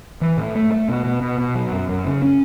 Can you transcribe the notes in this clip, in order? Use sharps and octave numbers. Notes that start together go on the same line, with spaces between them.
E3
A2
A3
A3
B2
B2
B2
B2
F#3
F#2
F#2
C#3
C#4